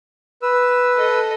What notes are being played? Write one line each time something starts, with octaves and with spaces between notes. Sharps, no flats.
B4 E6
A4 D#5